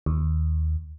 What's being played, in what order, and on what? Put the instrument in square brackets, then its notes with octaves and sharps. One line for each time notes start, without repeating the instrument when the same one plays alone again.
[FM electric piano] D#2